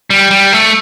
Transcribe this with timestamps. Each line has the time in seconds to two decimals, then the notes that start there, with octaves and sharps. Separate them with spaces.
0.10 G3
0.31 G3
0.53 A3